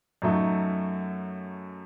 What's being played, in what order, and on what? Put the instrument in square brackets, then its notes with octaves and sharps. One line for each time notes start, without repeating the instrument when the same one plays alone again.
[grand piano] F#2 F#3 A3 D#4 F#4